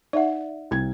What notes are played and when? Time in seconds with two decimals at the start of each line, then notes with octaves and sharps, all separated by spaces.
0.13 D#4 D5 E5 F#5
0.71 C2 E4 G#6